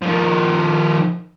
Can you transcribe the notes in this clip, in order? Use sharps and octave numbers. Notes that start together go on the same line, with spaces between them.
D#3 F3